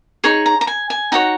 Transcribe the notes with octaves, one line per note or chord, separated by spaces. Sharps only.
D#4 G#4 C#5 C#6
A#5
A#5
G#5
G#5
D#4 F#4 C#5 F#5